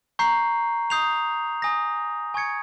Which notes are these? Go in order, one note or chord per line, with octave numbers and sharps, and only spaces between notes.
A#5 C#6 G6 C7
D#6 G6 C7 F7
G#5 D#6 A#6
G#5 C#6 G#6 C#7